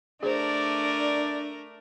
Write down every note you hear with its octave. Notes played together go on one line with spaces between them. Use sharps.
A3 D4 G#4 A#4 C5 D5